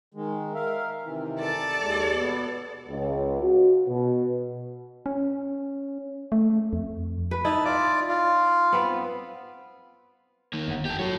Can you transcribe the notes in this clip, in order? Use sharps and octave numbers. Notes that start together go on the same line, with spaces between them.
D#3 G#3
A#4 E5 F5
C3 D#3 E3
A4 D5
D#2 G#3
B2 B3
C#2
F#4
B2
C#4
A3
F2
B4
D#4 E4 A5
F4 D5
F4
B3 C4 B4
D#3 A#3
G1 F#5
G4 A4
F#3 A4 C#5